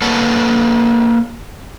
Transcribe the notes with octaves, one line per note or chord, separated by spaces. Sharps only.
A#3 A4 B4 C#5 F#5 A5